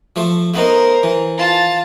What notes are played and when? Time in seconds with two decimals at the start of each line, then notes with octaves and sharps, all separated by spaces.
0.16 F3 A3 C5
0.54 A3 B3 D#4 A#4 C5
1.03 E3
1.38 F4 A5